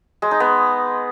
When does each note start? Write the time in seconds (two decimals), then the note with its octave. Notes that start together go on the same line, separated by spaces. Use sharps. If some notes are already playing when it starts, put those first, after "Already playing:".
0.22 G#3
0.31 D#4
0.40 B3